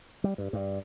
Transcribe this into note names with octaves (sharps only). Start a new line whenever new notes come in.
G3
G2
G2